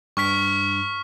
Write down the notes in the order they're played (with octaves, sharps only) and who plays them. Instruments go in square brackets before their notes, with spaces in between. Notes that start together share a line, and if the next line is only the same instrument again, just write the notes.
[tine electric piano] G2 [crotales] C#6 F6 B6